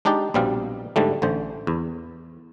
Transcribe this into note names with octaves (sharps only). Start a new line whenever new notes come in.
G#3 D4 D#4 G4 D5
A#1 B2 G3 C4 F5
G#2 D3 G3 A3
A1 D3 C5
E2